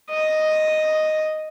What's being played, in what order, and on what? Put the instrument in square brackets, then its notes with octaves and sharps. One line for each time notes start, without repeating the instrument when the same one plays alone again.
[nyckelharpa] D#5